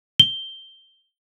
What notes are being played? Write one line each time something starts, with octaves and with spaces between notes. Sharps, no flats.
G7